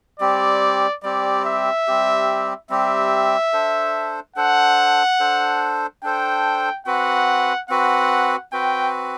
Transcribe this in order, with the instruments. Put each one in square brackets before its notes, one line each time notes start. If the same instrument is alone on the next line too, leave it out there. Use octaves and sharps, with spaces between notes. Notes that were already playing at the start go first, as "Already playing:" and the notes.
[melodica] G3 C4 G4 [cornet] D5
[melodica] G3 C4 G4 [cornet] D5
[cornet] E5
[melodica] G3 C4 G4
[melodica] G3 C4 G4 [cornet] E5
[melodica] D4 A4 C5
[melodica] D4 A4 C5 [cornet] F#5
[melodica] D4 A4 C5
[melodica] D4 A4 C5 [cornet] G5
[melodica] C4 F#4 B4 [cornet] F#5
[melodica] C4 F#4 B4 [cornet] F#5
[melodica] C4 F#4 B4 [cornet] G5